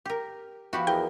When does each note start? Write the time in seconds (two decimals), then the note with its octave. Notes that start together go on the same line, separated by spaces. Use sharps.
0.05 G4 A#4
0.73 F3 B3 E4 F#4 G4
0.87 E2 A#4 D#5 G5